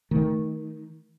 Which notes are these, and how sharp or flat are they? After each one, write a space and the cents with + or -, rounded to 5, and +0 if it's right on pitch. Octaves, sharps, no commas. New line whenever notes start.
D#3 +15 A3 +0